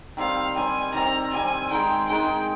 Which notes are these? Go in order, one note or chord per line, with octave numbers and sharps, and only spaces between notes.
D#3 G3 C4 F5
D#3 G3 C4 G#5
D#3 G3 C4 A#5
D#3 G3 C4 G#5
D#3 G#3 D#4 G#4 G5
D#3 G#3 D#4 G#4 G5